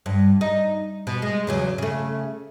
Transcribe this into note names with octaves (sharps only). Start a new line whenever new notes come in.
G2
D#4
B2
G#3
E2 C#3 F#3
C#3 A3